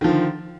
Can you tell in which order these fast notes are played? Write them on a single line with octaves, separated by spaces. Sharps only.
D#3 F3 D3